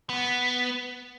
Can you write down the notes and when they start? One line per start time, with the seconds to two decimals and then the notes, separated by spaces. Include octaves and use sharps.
0.10 B3